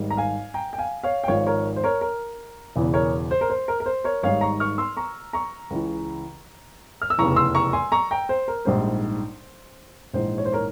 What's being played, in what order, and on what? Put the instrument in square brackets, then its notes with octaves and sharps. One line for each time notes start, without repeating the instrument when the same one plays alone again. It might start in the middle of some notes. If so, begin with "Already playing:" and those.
Already playing: [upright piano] G#1 G#2 G3
A#5
F5 G#5
G5 A#5
G5
F5 G#5
C#5 F5
G5
G#1 G#2 F3 C#5 F5
A#4 C#5
C5
A#4 C#5
A#4
E1 E2 C#3 E3
A#4 C#5
C5
A#4
C5
A#4
A#4
C5
A#4 C#5
G#1 G#2 G3 C#5 F5
A#5 C#6
C#6 F6
C6 E6
A#5 C#6
A#5 C#6
C#2 C#3 E3
F6
E6
F1 E2 C#3 E3 A#5 C#6
C6 E6
A#5 C#6
G#5 C6
A#5 C#6
G5 A#5
C5
A#4
A#1 G#2 G3 C5
A#1 G#2 E3 C5
C#5
C5
A#4 C#5